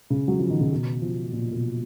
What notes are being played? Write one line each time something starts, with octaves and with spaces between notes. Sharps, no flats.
C#3
F#3
F3
D#3
C#3
B2
F3
A#2
B2